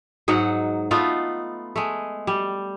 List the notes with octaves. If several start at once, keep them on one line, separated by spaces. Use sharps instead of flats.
G#2 F#3 D#4 F#5
A3 B3 D#4 F4
G#3 A3
G3